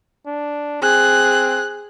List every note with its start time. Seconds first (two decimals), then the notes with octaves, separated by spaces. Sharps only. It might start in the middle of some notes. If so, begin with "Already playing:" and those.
0.27 D4
0.82 C4 G#4 F#6